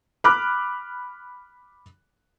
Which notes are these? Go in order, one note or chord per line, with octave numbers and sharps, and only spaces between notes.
B5 D6 F6 F#6